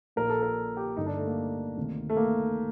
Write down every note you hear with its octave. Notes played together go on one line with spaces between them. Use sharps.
A#1 A#2 A#4
A4
A#4
G4
G1 G2 D3 D#4
D4
A3
A#3
D2 C3 D#3
A3
A#3